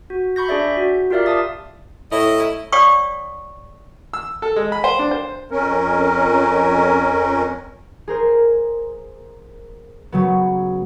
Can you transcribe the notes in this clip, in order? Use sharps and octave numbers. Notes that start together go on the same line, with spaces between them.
F#4
B5 C#6 G6 A#6
D4 G#4 D5 E5
F#4
F4 G4 A#4 D5 E5 F5
A5 D#6 A6
A2 E4 D#5
C#5 D5 F5 G5 C#6 D#6
E6
A4
G#3
B5
C5
D4
C5
F2 C#4 A#4
G#4 A#4 C5
C#3 F#3 B3